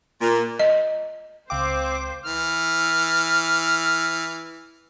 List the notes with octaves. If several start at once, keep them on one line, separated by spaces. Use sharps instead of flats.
A#2
D#5
C#2 C4 C5 F5 G5 D6
E3 F6